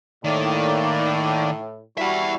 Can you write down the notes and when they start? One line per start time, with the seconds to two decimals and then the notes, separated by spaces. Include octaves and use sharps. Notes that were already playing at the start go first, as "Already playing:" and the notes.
0.24 A2 D#3 A#3 D5
1.98 G3 E4 F#4 E5 F#5